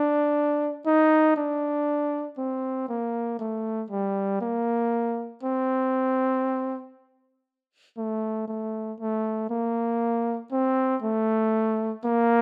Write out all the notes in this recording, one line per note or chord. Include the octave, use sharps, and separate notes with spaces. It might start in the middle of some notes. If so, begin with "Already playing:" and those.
Already playing: D4
D#4
D4
C4
A#3
A3
G3
A#3
C4
A3
A3
A3
A#3
C4
A3
A#3